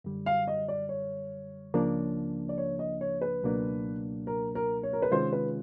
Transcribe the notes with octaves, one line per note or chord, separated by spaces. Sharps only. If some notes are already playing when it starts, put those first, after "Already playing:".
F#2 D3 G3
F5
D#5
D5
C#5
C#2 C#3 F3 A#3 D4
D5
C#5
D#5
C#5
B4
C#2 B2 F#3 A#3 D4
A#4
A#4
C#5
A#4
B4
C3 D#3 G#3 C#4 F4 C5
B4